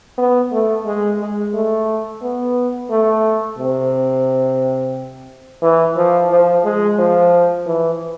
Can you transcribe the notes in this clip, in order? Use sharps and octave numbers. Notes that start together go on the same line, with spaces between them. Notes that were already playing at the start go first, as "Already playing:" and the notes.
B3
A3
G#3
G#3
A3
B3
A3
C3
E3
F3
F3
G#3
F3
E3